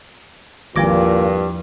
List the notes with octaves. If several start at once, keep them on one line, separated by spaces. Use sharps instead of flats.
G#1 E2 G2 A#2 F3 D6 A#6